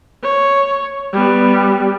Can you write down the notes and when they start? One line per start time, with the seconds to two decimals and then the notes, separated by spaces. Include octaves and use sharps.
0.23 C#5
1.13 G3 B3